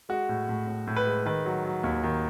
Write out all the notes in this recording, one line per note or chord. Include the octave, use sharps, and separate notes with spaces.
G#3 F#4
A2
A2
A2
A2
B4
G#3
D#3 B4
F#3
F#3
D#2
D#3